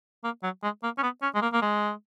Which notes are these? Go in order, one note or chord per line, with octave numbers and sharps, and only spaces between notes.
A#3
F#3
G#3
A#3
C#4
B3
C#4
G#3
A#3
A#3
G#3